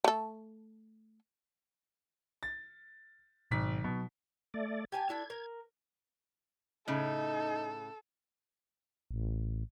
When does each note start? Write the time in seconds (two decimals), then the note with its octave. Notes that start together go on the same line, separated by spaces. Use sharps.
0.04 A3 A4
2.43 A6
3.51 G#1 B2 D#3 F#3 B6
3.84 B2 F#3
4.54 A3 D5
4.92 G4 G#5 A5 G#6
5.09 D4 E4 A4
5.30 A#4
6.88 A2 C#3 D#4 A4
9.11 A1